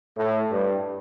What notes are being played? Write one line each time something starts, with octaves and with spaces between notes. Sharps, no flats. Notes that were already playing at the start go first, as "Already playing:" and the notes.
A2
G2